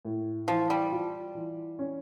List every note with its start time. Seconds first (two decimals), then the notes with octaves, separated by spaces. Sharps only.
0.05 A2
0.48 E3 F3
0.70 G3
0.92 F4
1.35 E3
1.79 C#4